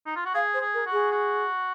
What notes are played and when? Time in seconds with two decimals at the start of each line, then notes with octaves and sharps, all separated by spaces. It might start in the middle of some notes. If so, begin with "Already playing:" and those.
0.06 D#4
0.16 F4
0.25 F#4
0.35 G#4 F5
0.54 C5
0.61 G#4
0.74 A#4
0.87 F#4
0.92 G#4
1.12 F#4